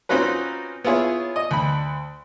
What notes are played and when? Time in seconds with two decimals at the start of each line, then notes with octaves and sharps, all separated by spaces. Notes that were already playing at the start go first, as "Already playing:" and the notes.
0.09 C4 C#4 D#4 F4 F#4 B4
0.85 B3 E4 F4 G#4 C#5
1.36 D#5
1.51 D2 B5